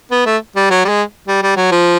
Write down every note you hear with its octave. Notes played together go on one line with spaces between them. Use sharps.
B3
A3
G3
F#3
G3
G#3
G3
G3
F#3
F3